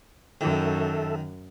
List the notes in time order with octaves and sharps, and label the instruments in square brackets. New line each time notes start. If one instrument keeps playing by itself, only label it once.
[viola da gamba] F#2 [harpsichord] D#3 [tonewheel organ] A4 E5